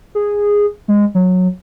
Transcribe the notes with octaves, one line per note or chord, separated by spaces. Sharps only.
G#4
G#3
F#3